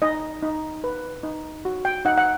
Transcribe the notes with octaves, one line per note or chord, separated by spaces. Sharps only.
D#4 D#5
D#4
B4
D#4
F#4
G5
D#4 F#5
F#5